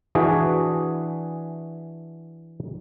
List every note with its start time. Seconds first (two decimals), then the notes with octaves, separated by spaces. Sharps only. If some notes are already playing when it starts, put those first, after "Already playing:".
0.15 E3 D4 F#4 G#4